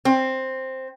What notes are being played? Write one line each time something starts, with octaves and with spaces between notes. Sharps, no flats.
C4